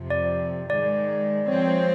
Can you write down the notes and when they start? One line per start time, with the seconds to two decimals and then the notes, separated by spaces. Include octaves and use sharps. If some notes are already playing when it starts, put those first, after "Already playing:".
Already playing: F2 C3 F3
0.10 D5
0.69 G#2 D#3 G#3 D5
1.48 F3 G#3 C4 C#5
1.68 C5